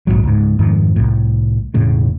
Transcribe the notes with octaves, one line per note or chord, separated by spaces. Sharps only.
A#1 E2 G#2 F#3
C#2 G#2
F2 G#2 D#3 F3
C2 A2
E1 A2 C#3